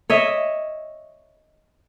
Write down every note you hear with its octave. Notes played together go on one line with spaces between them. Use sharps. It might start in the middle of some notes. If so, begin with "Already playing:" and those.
C#5 D#5 E5